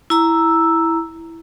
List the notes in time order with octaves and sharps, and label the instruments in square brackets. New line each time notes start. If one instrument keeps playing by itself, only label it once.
[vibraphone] E4 A#5 E6